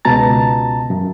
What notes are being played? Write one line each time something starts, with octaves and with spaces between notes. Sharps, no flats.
C#2 B2 A5 A#5 A6
F#2